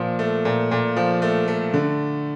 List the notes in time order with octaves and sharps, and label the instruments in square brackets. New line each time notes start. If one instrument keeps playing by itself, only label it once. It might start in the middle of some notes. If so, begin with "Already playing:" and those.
Already playing: [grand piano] A#2 F3
A3
A#2
A#2
F3
A3
A3
D3